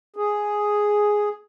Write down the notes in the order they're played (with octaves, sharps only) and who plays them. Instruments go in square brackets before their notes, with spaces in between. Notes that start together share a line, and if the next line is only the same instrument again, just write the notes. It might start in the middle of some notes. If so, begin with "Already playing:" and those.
[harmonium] G#4